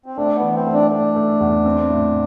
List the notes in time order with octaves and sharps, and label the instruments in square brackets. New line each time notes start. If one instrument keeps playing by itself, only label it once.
[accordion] C4
[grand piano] A3 [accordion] D4
[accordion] B3
[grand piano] E3
[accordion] C4
[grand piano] A3
[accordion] D4
[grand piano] A3 [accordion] D4
[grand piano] A3
E2
C4
A2